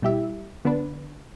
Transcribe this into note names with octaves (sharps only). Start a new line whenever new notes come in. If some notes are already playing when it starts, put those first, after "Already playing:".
B2 G3 E4 G4 E5
D3 B3 D4 B4